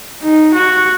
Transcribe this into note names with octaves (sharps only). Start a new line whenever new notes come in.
D#4
F#4